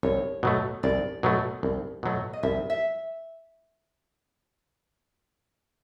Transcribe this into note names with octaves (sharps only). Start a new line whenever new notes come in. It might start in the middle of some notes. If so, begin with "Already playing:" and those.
C2 C#5
B2 F#3 A3
C2 D5
B2 F#3 A3
C2
B2 F#3 A3
D#5
C2 E5
E5